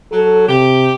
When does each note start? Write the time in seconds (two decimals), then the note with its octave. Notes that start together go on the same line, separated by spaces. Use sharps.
0.12 F#3 A4
0.49 C3 G4